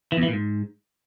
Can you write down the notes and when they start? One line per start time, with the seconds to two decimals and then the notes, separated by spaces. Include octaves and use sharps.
0.12 E3
0.17 E2
0.23 E3
0.28 A#2
0.33 G#2